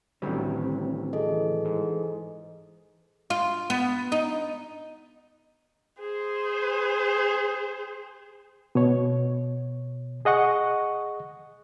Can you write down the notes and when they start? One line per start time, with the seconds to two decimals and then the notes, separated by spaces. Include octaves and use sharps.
0.22 A1 D2 A2 D#3 F#3 G3 C4
1.13 G#4 A4 D#5
1.26 E3
1.65 G#2
3.30 F4
3.70 B3
4.12 D#4
5.99 G#4 C5
8.75 B2 C#5
10.25 G#4 D#5 F#5 C#6